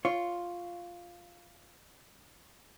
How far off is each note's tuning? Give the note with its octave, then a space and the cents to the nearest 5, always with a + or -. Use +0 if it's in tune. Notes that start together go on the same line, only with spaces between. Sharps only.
F4 +0 C#5 +0